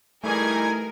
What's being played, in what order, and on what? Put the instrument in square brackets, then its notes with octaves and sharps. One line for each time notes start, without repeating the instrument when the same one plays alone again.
[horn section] E3 G3 D#4 [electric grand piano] A3 [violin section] G#4 G#5 G#6 [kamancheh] A#4